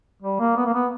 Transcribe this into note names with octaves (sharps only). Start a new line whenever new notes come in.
G3
A#3
B3
A#3
B3